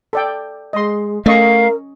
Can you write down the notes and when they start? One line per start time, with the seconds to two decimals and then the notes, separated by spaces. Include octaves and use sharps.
0.13 A4 D5 G5
0.73 G#3 D#5 C6
1.26 A3 C#4 A#4 D#5 F5 C#6